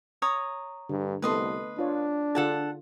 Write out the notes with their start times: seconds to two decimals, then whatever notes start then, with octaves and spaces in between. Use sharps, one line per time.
0.22 C#5 A#5 D#6
0.90 G2 D3
1.22 C2 A3 B3 A4 B4 D#5 C6
1.79 D4 F4 C#5
2.35 D3 F4 G#4 A4 F#5 A5